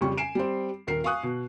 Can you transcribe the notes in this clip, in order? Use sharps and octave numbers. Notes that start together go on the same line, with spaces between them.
F2 C#3 G3 C#4 C#6
G#5 C7 D7 E7
G3 C4
D#1 A#4 C7
F5 G#5 C#6 D#6 F#6
B2